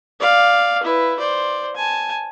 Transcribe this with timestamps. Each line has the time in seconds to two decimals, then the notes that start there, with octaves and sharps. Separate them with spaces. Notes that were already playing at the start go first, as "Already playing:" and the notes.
0.20 D5 F5
0.83 E4 B4
1.19 C5 D5
1.76 G#5 A5